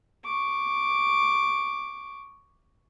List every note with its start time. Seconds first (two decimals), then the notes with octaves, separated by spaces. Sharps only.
0.25 C#6 D6